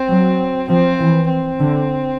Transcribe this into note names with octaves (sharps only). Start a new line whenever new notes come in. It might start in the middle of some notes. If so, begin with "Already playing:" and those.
Already playing: C4
F#3
F3 C4
E3
C4
D3